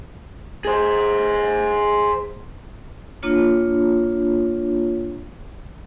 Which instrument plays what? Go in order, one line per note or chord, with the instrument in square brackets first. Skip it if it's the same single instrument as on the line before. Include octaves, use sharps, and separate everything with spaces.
[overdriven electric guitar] G#4 C5
[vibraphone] A#3 D4 F4 C#5